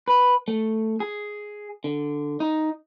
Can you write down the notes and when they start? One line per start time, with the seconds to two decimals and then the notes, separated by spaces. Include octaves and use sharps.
0.08 B4
0.48 A3
1.00 G#4
1.84 D3
2.40 D#4